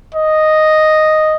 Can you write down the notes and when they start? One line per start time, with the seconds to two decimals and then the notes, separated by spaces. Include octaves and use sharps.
0.14 D#5